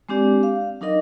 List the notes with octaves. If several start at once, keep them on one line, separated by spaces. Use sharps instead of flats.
G#3 C4 D4 G4 D5
F5
F#3 D4 D#4 A#4 D#5